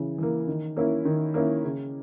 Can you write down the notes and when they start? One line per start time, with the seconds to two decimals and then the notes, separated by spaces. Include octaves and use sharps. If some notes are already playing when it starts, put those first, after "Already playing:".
Already playing: C#3 E3
0.18 E3 A#3
0.48 D#3
0.76 A#3 C#4 E4
1.05 D#3
1.34 A#3 C#4 E4
1.63 C#3